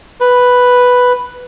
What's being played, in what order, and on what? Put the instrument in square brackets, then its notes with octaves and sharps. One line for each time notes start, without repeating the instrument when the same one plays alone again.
[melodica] B4